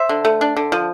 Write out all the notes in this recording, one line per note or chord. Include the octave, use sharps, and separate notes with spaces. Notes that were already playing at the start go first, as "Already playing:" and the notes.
Already playing: C5 E5
D3
A3
D4
D3
F3